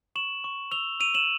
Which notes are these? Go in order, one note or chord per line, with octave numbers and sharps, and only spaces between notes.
C#6 E7 F#7
C#6
E6 F7 G7
E6 D#7 F7
E7 F#7